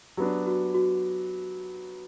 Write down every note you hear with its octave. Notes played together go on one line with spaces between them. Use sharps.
F#3 B3 D4 G4
F#4
F#4